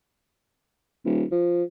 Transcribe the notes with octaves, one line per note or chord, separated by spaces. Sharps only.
D#1
F3